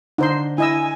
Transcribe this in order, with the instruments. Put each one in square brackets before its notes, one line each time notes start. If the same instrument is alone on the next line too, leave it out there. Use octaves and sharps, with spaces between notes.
[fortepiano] D3 [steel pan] D#4 C5 C6
[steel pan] E4 D#5 E6 [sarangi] G#5